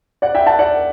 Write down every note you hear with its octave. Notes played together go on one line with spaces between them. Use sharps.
D5 F#5
E5 G5
F#5 A5
D5 F#5